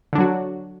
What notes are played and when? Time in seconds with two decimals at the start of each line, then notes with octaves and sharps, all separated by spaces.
0.13 D3
0.15 D4
0.18 F#3
0.20 F#4